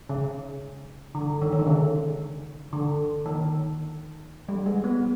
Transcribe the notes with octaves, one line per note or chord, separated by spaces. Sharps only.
C#3
D3
D#3
D#3
D3
C#3
D3
D#3
G3
G#3
B3